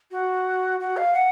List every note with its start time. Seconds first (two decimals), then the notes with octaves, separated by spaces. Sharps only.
0.11 F#4
0.80 F#4
0.97 F5
1.14 F#5